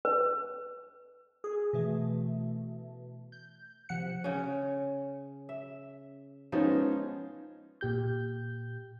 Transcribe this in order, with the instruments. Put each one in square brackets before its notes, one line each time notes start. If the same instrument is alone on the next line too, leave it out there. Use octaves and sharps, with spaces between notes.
[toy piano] B4
[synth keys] G#4
B2 E3 A3
G6
C3 F3 F#5 F#6 C#7
[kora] C#3 C#4
E5
[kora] F3 G#3 [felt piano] B3 C#4 D#4
[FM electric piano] A#2 G4 G6